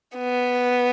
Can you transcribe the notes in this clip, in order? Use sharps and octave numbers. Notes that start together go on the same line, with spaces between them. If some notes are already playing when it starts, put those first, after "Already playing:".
B3